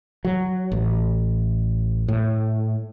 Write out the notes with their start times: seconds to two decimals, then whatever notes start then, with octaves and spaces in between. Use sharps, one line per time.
0.25 F#3
0.72 A1
2.08 A2